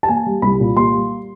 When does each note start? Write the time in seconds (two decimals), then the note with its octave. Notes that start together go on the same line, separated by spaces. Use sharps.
0.03 A5
0.08 A#3 G#5
0.26 G3
0.42 C2 B5
0.60 A#2
0.77 A#3 C6
0.94 G3